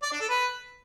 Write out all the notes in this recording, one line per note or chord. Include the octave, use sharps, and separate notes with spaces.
D5
D4
A4
B4